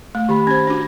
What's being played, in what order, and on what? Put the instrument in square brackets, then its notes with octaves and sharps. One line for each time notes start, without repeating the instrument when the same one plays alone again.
[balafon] A3
[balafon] D#3 [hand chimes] G4 B5
[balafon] C#4 C5 [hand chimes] G#6
[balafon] D4 F#4